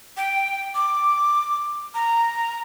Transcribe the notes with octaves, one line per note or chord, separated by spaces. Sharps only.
G5
D6
A#5